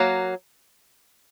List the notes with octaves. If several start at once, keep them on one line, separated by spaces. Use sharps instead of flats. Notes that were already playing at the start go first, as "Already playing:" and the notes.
Already playing: F#3 A#3